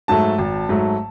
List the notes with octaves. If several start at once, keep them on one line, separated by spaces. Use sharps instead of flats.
G#2 F#3 A3 A5
G#1
G#2 F#3 A3